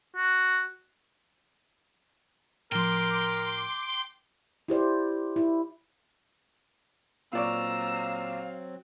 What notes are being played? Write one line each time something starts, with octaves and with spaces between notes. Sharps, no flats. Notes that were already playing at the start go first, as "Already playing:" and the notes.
F#4
A2 F3 A#4 G5 C6 D6
E4 G4 C5 D5
E4
A#2 F#3 C4 D5 F5 A#5 C#6 E6